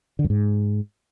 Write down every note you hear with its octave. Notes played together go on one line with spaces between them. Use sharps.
D3
F#2
G#2